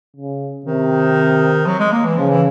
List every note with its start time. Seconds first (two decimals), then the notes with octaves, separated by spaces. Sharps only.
0.16 C#3
0.66 C3 D#3
1.67 F#3
1.80 G#3
1.92 A#3
2.05 E3
2.17 C#3 F3
2.29 E3